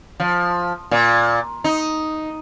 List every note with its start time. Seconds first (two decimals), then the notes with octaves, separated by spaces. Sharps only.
0.20 F3
0.91 A#2
1.64 D#4